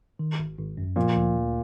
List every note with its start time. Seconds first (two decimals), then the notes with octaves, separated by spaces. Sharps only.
0.19 D#3
0.39 G#1
0.58 G#1
0.77 F#2
0.96 A#2 F3
1.16 D2
1.35 D2